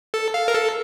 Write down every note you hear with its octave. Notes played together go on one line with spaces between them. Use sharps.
A4
F5
A#4
A4